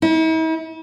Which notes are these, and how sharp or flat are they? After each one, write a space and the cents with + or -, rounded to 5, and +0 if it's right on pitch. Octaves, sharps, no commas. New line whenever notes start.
E4 -45